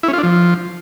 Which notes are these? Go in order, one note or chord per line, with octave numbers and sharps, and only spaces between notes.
E4
C#4
F4
D4
F3